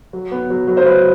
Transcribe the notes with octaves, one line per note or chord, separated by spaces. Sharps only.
F#3
B3
F#3
F#3
C5
F#3 B4